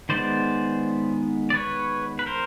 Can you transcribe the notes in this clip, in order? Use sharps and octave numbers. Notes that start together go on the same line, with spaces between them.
D#3 G#3 B3 C5 D5
D5
B4 C#5
B4
A#4 C5